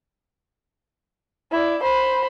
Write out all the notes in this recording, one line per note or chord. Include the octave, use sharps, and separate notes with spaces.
E4 D5
C5 B5